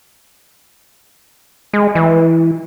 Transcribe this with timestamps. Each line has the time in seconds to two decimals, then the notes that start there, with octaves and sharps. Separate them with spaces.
1.73 G#3
1.95 E3